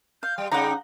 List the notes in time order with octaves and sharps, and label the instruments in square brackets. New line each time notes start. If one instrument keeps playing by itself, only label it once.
[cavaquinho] F5 [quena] G6
[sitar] G3 [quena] G5
[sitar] C#3 G3 D#4 [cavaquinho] F#5 A#5 [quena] G5